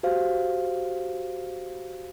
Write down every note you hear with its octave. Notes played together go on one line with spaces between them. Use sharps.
F#4 G4 C5 F5